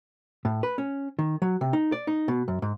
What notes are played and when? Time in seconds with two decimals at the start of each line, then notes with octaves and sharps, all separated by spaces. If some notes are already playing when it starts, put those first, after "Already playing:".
0.45 A2
0.63 B4
0.78 C#4
1.19 D#3
1.42 F#3
1.61 C3
1.73 D#4
1.92 D5
2.07 D#4
2.28 B2
2.48 F#2
2.62 G#2